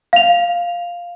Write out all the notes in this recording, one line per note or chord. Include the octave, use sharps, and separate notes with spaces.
F5 F7